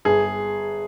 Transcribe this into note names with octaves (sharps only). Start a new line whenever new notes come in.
G1 G#4